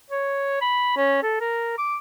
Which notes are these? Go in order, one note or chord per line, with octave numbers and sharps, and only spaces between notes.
C#5
B5
C#4
A4
A#4
D6